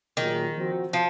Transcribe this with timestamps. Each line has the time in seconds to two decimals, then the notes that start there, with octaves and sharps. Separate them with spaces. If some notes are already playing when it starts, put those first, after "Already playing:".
0.17 A#2 D#3 F#3 A#3 F4 G#4
0.55 F3 C4 F#4
0.93 F3